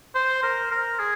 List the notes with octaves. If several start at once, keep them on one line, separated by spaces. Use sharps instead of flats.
C5
A#4
A#4
G#4